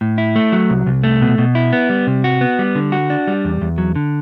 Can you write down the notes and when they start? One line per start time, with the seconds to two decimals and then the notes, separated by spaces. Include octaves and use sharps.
0.01 A2
0.18 E4
0.36 A3
0.52 F#3
0.70 C2
0.86 C2
1.03 A3
1.21 B2
1.38 B2
1.55 E4
1.73 B3
1.89 G3
2.07 C3
2.24 F#4
2.41 B3
2.59 G3
2.75 D3
2.92 F#4
3.10 D4
3.27 G3
3.45 E2
3.61 E2
3.78 F#3
3.96 D3